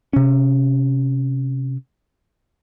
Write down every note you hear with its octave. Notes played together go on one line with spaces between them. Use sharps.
C3 C#4